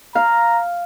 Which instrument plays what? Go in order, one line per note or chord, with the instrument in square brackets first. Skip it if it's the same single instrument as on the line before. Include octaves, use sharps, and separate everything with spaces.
[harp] F5 [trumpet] A#5